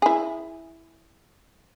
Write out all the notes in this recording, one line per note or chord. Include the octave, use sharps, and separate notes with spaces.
E4 G#4